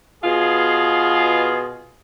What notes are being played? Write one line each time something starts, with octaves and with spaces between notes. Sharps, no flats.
B2 F4 G#4